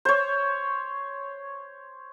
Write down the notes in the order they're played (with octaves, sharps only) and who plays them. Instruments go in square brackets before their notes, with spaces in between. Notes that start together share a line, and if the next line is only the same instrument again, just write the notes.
[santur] C5 C#5